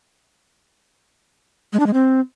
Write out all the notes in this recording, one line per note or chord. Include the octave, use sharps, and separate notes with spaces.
G#3
D4
G#3
C4